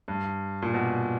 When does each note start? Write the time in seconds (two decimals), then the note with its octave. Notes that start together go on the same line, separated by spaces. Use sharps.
0.08 G2
0.62 A#2
0.74 B2